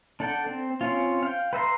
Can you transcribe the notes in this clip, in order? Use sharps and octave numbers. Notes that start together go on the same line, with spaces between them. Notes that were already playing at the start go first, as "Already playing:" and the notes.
D4 A4 F#5 G5
C4
C4 C#4 F4
F5 G5
B4 E5 A#5 C6